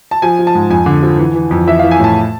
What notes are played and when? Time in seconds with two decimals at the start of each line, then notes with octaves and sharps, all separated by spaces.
0.11 A5
0.22 F3 G#5
0.39 F3
0.47 A5
0.55 G#2
0.70 F2 G#5
0.86 D3
1.02 F3
1.19 E3
1.35 E3
1.51 F2
1.67 E3 E5
1.79 E3 F5
1.91 G#5
1.99 A2 A5